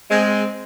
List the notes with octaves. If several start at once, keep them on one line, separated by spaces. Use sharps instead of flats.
G#3 C4